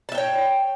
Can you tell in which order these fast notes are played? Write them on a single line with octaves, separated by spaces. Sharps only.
A5 E5 G5 C#5